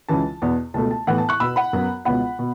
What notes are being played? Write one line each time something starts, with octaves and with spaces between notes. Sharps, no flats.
C#2 C#3 E3 A5
E2 B2 B3
C#2 B2 A3 A5
A5
A2 E3 B3 F#5
A5
C#6 F#6
B2 B3 B5 E6
F#5 B5
F#2 F#3 B3
C#2 B2 B3 F#5 B5
B2